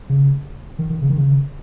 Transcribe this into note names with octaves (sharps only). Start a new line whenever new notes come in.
C#3
D#3
D#3
C#3
D#3
C#3